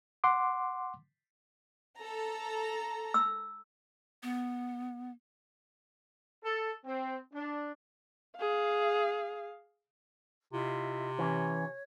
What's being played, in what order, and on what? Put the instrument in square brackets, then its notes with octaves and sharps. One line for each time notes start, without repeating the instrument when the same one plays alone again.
[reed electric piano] F#5 C6 D6
[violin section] A4 A#5
[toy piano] E6
[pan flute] B3
[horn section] A4
C4
D4
[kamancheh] G#4 F5
[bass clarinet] C3 [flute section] E4 F4 D#5
[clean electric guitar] E3 C#4 [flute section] C#5